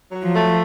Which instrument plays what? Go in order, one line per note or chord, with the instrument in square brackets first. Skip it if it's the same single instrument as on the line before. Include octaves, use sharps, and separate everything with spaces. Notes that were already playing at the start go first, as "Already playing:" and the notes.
[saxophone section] F#3
[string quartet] F3
[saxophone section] A3